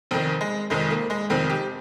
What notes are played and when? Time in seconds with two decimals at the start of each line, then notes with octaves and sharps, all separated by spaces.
0.11 F1 F2 D#3 C4
0.41 G#3
0.70 F1 F2 D#3 G#3
0.90 A#3
1.10 G#3
1.30 F1 F2 D#3 C4
1.50 G4